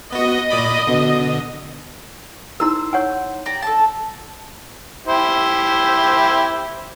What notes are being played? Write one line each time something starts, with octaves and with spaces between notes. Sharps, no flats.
B3 F#4 D#5
A#2 D5 B5
B2 D3
D#4 E4 A#4 C5 E6
C#5 F#5 G#5
G4 D5 A#5
A4 A5
E4 G4 C5